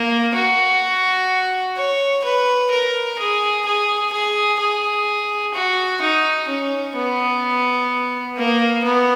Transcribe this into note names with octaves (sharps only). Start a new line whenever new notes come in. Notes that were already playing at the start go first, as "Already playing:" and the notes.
Already playing: A#3
F#4
C#5
B4
A#4
G#4
G#4
G#4
G#4
F#4
D#4
C#4
B3
A#3
B3